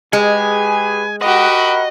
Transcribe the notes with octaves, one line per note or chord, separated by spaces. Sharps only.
G#3 G4 G#4 B4 G#5
F#4 G4 A#4 D#5 F#5 B5